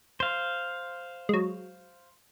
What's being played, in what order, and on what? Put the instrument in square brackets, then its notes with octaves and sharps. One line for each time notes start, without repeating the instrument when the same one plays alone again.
[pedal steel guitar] C5 F5
[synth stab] F#3 G#3